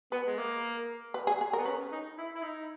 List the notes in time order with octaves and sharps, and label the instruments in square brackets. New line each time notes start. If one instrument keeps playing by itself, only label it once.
[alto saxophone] B3 [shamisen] B4
[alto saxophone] G#3
A#3
[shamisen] B4
G#4
G#4
A#4
[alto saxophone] B3
[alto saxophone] C#4 [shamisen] B4
[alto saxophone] D#4
E4
E4
D#4